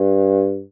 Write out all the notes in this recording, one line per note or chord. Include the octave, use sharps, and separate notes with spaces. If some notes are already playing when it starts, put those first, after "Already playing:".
Already playing: G2